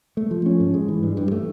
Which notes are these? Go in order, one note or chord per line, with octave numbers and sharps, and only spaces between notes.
A3
F3
C#4
G#2
G#3
E3
G2
G2
A3